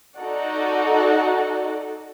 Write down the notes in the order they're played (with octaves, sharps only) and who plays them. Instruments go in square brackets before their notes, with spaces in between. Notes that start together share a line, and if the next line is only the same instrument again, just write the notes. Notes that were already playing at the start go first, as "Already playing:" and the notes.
[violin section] D#4 F#4 A4 D5 F#5